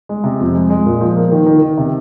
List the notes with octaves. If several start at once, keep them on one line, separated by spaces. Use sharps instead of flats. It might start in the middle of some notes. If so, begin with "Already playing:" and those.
G#3
C3
F2
G#3
G#3
A#2
F3
A#3
D#3
D#3
D#3
C3